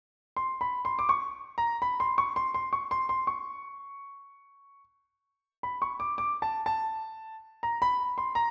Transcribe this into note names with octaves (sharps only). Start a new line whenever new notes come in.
C6
B5
C6
D6
C#6
A#5
B5
C6
C#6
C6
C6
C#6
C6
C6
C#6
B5
C#6
D6
D6
A5
A5
A#5
B5
C6
A#5